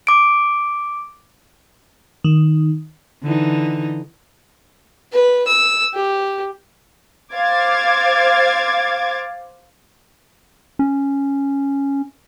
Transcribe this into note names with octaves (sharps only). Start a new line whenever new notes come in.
D6 D7
D#3
D3 E3 D#4
B4
E6
G4
C5 F5 D6 G#6 A6
C#4